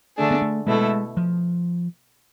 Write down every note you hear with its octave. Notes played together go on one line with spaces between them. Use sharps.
D3 A3 D4 G#4
B3
A3
B2 G#3 A3 E4 A4
F3